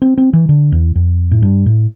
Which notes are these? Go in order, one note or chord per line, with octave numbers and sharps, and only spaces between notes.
C4
C4
E3
D3
E2
F2
A2
G2
A2